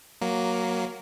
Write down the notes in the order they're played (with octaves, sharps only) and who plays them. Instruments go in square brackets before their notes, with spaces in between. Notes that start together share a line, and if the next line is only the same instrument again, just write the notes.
[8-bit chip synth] F#3 A#3